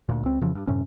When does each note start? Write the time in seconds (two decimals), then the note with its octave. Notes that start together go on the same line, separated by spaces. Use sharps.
0.09 D2 A#2
0.23 C#2 C4
0.41 F2 C#3 E3 F3
0.55 G2
0.67 F#2 A2 C3 C#4